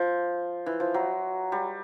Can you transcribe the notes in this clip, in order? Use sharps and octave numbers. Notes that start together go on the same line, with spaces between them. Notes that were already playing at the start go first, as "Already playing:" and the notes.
Already playing: F3
E3
F3
F#3
G3